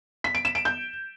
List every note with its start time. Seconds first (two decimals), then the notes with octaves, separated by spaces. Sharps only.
0.24 B6
0.35 D7
0.45 E7
0.55 D7
0.65 G6